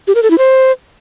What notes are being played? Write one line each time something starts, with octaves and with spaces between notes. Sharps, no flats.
G4
A#4
A4
E4
C5